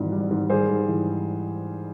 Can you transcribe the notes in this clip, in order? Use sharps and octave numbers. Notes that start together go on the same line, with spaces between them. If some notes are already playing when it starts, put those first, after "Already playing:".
Already playing: G#1 G#2 E3 G3
G3
G#2
G3 G#4 C5
G#2
E3